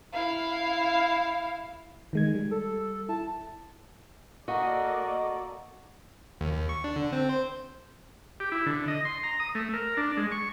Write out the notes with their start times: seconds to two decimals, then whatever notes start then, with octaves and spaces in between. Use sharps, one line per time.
0.13 E4 F5
2.13 D#3 G#3 G#6
2.35 G3
2.51 A4
3.09 E4 A5
4.48 A#3 F#4 A4 D5 D#5 F5 F#5 A#5
6.41 D#2
6.53 D#2
6.69 C#6
6.84 D4
6.96 D3
7.13 C4
7.29 C5
8.40 G4
8.52 E4
8.66 D3
8.88 D#5
9.05 C6
9.23 A#5
9.40 D#6
9.55 A3
9.74 A#4
9.97 D4
10.17 G#3
10.32 C#6